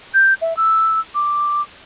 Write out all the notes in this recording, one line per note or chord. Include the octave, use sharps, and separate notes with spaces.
G6
E5
E6
D6